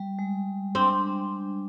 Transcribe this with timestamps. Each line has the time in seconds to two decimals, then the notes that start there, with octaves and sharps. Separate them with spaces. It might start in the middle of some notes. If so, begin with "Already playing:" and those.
Already playing: G3
0.19 G#3
0.75 C4 D4